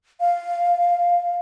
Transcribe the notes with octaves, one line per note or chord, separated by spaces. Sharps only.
F5